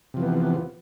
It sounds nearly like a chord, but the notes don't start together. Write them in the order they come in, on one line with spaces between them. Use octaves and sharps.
C3 F3 E3 B3